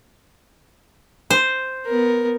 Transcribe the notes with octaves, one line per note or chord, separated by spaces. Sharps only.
C5
B3 A#4